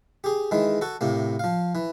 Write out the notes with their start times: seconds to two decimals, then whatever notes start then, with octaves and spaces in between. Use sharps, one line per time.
0.24 G4 G#4
0.51 D#3 E3 G#3
0.81 F#4 A4
1.01 A2 C3 A#3
1.39 F3 F5
1.75 E3